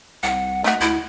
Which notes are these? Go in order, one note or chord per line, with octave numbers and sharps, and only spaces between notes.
C2 F#5
A3 D#4 F#4
D2 E4